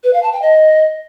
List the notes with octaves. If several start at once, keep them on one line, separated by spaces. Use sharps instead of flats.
B4
F5
A5
G5
D#5